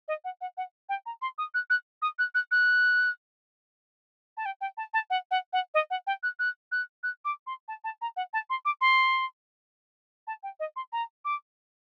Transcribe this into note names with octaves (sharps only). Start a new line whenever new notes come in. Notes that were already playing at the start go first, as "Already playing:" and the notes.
D#5
F#5
F#5
F#5
G5
A#5
C6
D#6
F#6
F#6
D#6
F#6
F#6
F#6
A5
G5
G5
A5
A5
F#5
F#5
F#5
D#5
F#5
G5
F#6
F#6
F#6
F#6
D6
C6
A5
A5
A#5
F#5
A5
C6
D6
C6
A5
G5
D#5
C6
A#5
D6